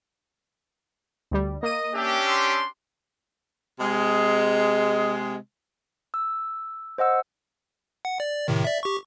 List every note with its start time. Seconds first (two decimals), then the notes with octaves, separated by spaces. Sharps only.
1.31 D2 G3
1.63 A#3 D#5 D#7
1.95 C#4 D4 G4 E5
2.27 C6 E6
3.80 C3 G#3
6.14 E6
6.98 C5 D#5 F#5 E6
8.05 F#5
8.20 D5
8.48 A2 C3 D#3
8.64 D5 E5
8.83 G4 C#6